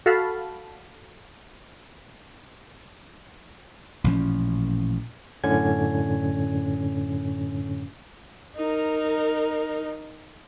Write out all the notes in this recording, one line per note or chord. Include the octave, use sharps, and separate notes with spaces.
F#4 A4 F5 A5 B5
A1 A#2 F3 C#4
F#2 A2 D3 C#4 G#6
D#4 A#4